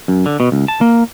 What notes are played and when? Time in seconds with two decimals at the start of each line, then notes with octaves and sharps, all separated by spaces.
0.08 F#2
0.26 D3
0.40 B2
0.52 C#2
0.68 A5
0.81 A#3